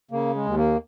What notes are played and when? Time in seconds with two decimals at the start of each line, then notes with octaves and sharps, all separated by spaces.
0.11 C#3 A#3
0.35 G#3
0.46 D#2
0.57 A#3